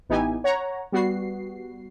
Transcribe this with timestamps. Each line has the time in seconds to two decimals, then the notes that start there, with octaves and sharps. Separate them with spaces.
0.09 A1 B3 D#4 E4 G4 G#5
0.44 C#5 F#5 A#5
0.92 G3 B3 F#4 C7